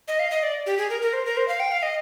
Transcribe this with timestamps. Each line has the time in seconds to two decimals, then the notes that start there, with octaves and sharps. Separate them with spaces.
0.08 D#5
0.19 F5
0.31 D#5
0.43 D5
0.66 G4
0.78 G#4
0.90 A#4
1.02 A#4
1.13 C5
1.25 A#4
1.37 C5
1.48 F5
1.60 G5
1.72 F5
1.83 D#5